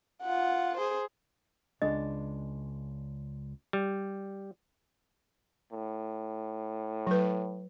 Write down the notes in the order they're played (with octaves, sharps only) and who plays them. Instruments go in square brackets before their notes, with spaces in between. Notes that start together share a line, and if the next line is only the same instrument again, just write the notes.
[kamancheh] F4 F#5
G#4 C5
[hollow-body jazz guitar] C#2 G#3 D4 [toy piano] D#5
[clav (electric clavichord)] G3
[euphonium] A2
[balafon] F#3 B4